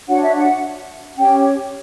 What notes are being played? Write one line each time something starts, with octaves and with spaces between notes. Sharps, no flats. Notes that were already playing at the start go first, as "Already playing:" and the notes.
D4 F#4 C#5 F#5
E5
F#5
C#4 G4 C#5 G5